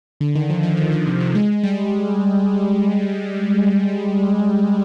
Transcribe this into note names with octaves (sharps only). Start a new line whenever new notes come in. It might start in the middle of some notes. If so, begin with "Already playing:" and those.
D3
D#3
F3
F3
D#3
D#3
C3
D3
G#3
G3